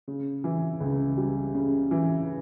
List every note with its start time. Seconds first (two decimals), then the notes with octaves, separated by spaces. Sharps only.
0.08 C#3
0.44 E3
0.81 C#2
1.17 G3
1.54 C#3
1.91 E3